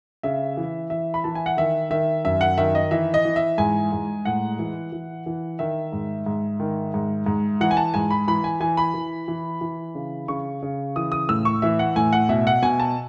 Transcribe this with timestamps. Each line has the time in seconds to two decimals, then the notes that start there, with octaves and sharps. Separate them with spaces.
0.23 C#3 E5
0.57 E3
0.90 E3 E5
1.14 B5
1.24 E3 A5
1.35 G#5
1.46 F#5
1.57 D#3 E5
1.90 D#3 E5
2.25 F#2 E5
2.41 F#5
2.58 D#3 E5
2.75 D#5
2.91 E3 E5
3.14 D#5
3.25 E3
3.36 E5
3.58 G#2 G#5
3.92 G#2
4.25 A2 F#5
4.59 E3
4.92 E3
5.26 E3
5.59 D#3 E5
5.93 G#2
6.26 G#2
6.60 D#3
6.94 G#2
7.26 G#2
7.61 E3 F#5
7.71 G#5
7.77 A5
7.94 G#2 G#5
8.10 B5
8.28 E3 B5
8.44 G#5
8.60 E3 G#5
8.77 B5
8.94 E3
9.28 E3
9.61 E3
9.95 C#3
10.28 C#3 C#6
10.62 C#3
10.96 E3 D#6
11.12 D#6
11.29 A2 E6
11.45 C#6
11.62 E3 E5
11.79 F#5
11.96 A2 G#5
12.13 F#5
12.29 B2 E5
12.47 F#5
12.63 B2 G#5
12.80 A5